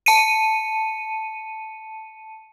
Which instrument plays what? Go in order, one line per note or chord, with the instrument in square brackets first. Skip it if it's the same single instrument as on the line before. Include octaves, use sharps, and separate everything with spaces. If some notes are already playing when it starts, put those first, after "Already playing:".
[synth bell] A5 C#7 D#7